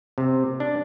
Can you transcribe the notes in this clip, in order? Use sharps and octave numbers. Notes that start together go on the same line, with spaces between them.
C3
D4